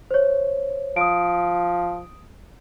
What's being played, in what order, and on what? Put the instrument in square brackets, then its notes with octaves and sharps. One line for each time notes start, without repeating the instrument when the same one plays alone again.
[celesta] C5 C#5
[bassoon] F3 [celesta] D#6 D7